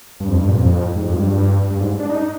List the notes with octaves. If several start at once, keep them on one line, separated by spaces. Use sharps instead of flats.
G2
F2
G2
A#2
F2
G#2
F2
G2
G2
G#2
D4
D#4